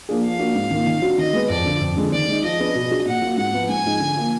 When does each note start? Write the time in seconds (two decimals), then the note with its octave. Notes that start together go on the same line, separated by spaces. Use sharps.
0.09 F3 A#3 D4 G#4
0.24 F3 F5
0.39 A#3 D4 F#4
0.56 G#2
0.71 D#3 A#3 F4
0.87 D#3
1.02 F#3 D4 F#4
1.18 D#3 D#5
1.33 G#3 B3
1.49 F2 D5
1.65 D3 F3
1.81 F2
1.97 D3 G#3
2.12 D#3 D5
2.28 G#3 D#4
2.43 F3 D#5
2.60 B3 D4 G#4
2.75 B2
2.91 F#3 D4 G#4
3.06 A#2 F#5
3.22 F#3 A#3 F4
3.37 G#2 F#5
3.53 F3 B3
3.69 G#2 G#5
3.85 F3 G#3 D#4
4.00 D3
4.16 F3 A#3